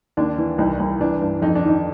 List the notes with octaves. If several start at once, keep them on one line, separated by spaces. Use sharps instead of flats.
D#2 D4
E3
C2 D#4
C2
E3 D4
G2
F2 D#4
D4
D#3 D#4